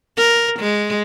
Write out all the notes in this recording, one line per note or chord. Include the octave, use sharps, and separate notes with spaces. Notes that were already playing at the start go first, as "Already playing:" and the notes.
A#4
G#3